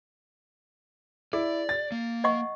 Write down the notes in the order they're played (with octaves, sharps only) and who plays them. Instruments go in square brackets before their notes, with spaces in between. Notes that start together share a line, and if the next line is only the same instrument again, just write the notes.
[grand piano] E4 [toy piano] G#4 [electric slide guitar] D5
[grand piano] A6
[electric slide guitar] A#3
[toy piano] D#5 F#5 C#6